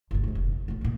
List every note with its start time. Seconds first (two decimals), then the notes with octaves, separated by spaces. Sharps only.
0.11 G1 A#2
0.24 A1 G#2
0.35 F1
0.52 F2
0.68 A1 F#2
0.81 A#2 D#3